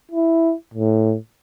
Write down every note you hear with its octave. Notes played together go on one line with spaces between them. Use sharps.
E4
A2